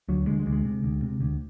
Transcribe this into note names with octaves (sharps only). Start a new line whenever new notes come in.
D2 F#3
D3 G#3
G#3
D2
G#3
C3
D2
C3
D2